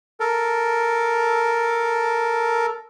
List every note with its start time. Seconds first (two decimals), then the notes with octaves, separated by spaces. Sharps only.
0.20 A4 A#4